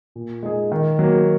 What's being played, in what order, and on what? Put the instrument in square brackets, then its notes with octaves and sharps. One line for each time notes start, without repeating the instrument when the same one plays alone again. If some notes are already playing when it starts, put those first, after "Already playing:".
[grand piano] A#2
G#3 D#4 G#4
D#3
F#3 A#3